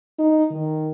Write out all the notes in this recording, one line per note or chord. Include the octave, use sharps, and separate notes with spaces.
D#4
D#3